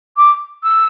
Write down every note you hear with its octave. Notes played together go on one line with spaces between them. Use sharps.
D6
E6